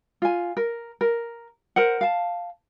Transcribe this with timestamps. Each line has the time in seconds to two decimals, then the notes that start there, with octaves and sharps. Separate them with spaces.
0.22 F4 G#5
0.57 A#4
1.01 A#4
1.76 A#4 C5 F#5
2.01 F5 A5